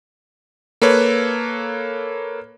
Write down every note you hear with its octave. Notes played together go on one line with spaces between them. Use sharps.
A#3 A4 B4 C#5